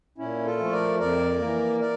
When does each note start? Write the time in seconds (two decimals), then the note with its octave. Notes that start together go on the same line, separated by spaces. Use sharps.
0.18 A#2 C#4 E4
0.45 F4 A4
0.59 F3 A3
0.72 A#4 D5
0.99 F2 A#4 D5
1.39 E3 A#3
1.80 A#4 D5